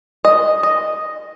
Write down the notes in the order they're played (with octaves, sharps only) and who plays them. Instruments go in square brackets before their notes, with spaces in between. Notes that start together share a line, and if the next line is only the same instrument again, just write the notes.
[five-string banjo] D#5
D#5